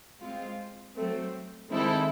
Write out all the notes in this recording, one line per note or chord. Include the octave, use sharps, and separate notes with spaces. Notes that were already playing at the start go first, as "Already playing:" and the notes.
G#3 C4 F4
F#3 A3 C4
D#3 G#3 C4 E4 A4